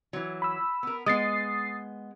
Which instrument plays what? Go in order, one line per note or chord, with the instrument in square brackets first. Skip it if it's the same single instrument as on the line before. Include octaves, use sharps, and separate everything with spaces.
[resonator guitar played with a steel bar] E3 F#3
[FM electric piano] B5 E6
[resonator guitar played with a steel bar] B3 A#4
[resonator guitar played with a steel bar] G#3 B3 [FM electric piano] D#6 A6 C7